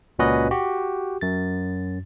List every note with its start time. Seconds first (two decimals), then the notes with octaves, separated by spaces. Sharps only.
0.19 C#2 A#2 C#4 F#4 B4 D#5
0.51 F#4 G4
1.21 F#2 A6